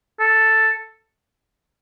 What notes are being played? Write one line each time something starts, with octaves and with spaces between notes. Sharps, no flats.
A4